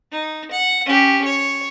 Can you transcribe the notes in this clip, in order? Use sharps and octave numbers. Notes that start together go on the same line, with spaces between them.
D#4
F#5
C#4 G4
C#5